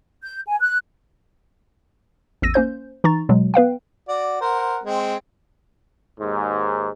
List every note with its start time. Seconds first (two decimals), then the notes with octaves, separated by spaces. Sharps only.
0.23 G6
0.47 G#5
0.59 F#6
2.42 A1 E2 E6 A#6 D#7
2.54 A#3 C#4 C5 G6
3.04 E3 D#4 A#5 C#6 A6
3.29 B2 F#3 G#3
3.54 B3 B4 F5 G5
4.08 F#4 D5
4.41 A#4 C5 F#5
4.84 G#3 C4
6.19 D#2 G#2